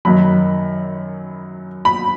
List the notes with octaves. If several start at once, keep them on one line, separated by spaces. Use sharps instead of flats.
F#2 D#3 F#3 B5
B5